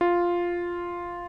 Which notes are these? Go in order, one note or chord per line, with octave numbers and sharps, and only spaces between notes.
F4